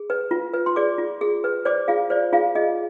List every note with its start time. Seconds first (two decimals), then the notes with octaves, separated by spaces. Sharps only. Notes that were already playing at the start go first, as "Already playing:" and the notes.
Already playing: G#4
0.10 B4
0.31 F4
0.53 B4
0.66 C6
0.76 G#4 D5 D6
0.98 F4
1.21 G#4
1.44 B4
1.65 C5 D5 D6
1.88 F4 G#4 F5
2.10 C5 D5
2.33 F4 G#4 F5
2.55 G#4 D#5